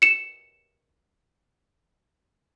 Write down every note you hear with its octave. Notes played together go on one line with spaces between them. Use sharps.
C#7 E7